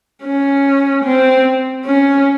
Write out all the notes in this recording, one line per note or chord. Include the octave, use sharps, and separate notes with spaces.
C#4
C4
C#4